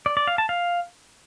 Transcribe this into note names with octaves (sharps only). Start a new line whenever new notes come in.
D5
D5
F5
A5
F5